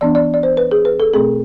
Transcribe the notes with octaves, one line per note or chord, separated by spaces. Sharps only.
E3 B3 D4 D5
D5
D5
C5
B4
G#4
B4
A4
B2 A3 C4 G#4